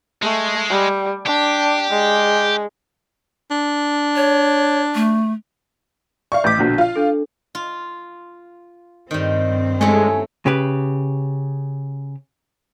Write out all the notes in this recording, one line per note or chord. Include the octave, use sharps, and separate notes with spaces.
G#3 A3
G3
D4 G4
G#3
D4
C#5
A3
D5 E5 F5 C#6
A1 D6 G6 B6
A#1 B2 D3
F4 F5
D4 A4
F4
G2 D#3 G3 C4
G#3 A3 C#4 E4 G#5
C#3 G4 B4